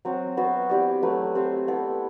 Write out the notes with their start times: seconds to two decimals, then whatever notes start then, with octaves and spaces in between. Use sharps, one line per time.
0.05 F#3 C4 F#4
0.37 B3 F#4 C5 E5
0.69 C4 E4 G4 D5
1.02 F#3 A3 E4 B4
1.35 C4 G4 C5 E5
1.68 B3 E4 A4